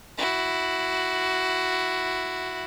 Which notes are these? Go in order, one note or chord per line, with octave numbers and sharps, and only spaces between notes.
E4 F#4